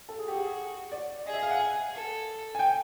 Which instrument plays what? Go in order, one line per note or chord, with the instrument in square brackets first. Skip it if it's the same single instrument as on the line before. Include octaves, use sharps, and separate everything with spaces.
[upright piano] A4
G#4
[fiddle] F#4 [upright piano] G4
[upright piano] G#4
D5
[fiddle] G#4 [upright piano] D#5
[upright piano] E5
F5
F#5
G#5
[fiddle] A4
[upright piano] G#5
G5